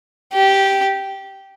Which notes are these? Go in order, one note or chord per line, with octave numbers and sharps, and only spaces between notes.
G4